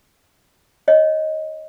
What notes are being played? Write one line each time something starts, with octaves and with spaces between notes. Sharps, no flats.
C#5 D#5